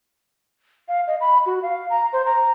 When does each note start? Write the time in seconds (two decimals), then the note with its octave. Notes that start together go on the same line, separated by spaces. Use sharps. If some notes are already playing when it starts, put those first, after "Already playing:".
0.88 F5
1.07 D#5
1.20 B5
1.46 F#4
1.62 F5
1.90 A#5
2.13 C5
2.25 A#5